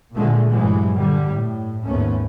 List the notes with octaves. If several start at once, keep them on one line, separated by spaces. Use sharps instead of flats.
A#2 D3 G#3 A3
G2 E3 F#3 G#3
D3 G3
A2
D#2 G#2 A3 B3 C#4